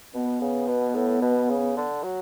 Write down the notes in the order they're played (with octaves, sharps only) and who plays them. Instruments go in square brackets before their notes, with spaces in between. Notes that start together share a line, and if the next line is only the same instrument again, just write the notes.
[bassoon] B2 [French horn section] B3
[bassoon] C#3
B2
A2
B2
C#3
D3
F#3